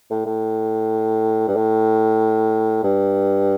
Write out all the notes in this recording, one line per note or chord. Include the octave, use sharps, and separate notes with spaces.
A2
A2
G2
A2
G2